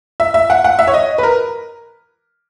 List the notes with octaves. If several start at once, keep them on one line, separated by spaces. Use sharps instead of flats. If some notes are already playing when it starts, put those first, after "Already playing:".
E5
E5
F#5
F#5
E5
C#5
D#5
B4
A#4